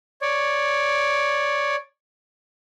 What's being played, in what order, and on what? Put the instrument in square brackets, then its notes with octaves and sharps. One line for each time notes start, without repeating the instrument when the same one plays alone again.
[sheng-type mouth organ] C#5 D5